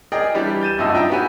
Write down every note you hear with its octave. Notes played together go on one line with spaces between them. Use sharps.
G#4 A#4 D5 D#5 G5
E3 G3 D4 G4 D5
G6 A6 D#7 E7
F#1 D2 G2 A#2 D#5 E6
D4 D#4 E5 G5 A#5
B3 F#4 G4 B4 G#5